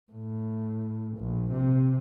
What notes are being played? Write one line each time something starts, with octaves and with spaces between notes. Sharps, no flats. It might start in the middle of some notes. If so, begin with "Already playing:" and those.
A2
A#1
C3